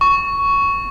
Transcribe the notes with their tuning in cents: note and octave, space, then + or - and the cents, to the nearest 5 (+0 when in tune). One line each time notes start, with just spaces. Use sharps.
C#6 +10